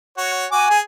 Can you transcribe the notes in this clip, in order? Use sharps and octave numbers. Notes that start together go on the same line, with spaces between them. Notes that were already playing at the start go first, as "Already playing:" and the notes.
F#4 C#5
F#4 G#5 D6
G#4